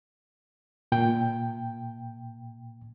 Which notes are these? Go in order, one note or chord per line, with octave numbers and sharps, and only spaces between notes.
A#2 G5